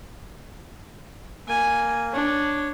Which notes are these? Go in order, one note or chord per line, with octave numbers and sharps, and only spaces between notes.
A#3 G#5
D4 C#5